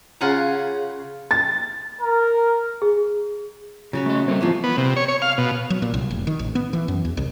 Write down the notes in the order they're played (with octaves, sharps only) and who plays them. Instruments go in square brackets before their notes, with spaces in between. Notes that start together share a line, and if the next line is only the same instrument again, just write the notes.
[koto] C#3 F4 F#5 G#5 A#5
[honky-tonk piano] A6
[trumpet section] A#4
[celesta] G#4
[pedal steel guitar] C#3 [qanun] F#3 F#4 C#5
[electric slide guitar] A3 D#5
[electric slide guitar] G3 A3 A#3 [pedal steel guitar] C4 C#6
[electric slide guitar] G#2 E3 [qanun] F3 A#3 B3
[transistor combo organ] B3
C3
C#5
C#5
F5
B2
[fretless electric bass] F#3
A#2
C2
F1
D#3
A1
B3
E3
F#2
E2
C2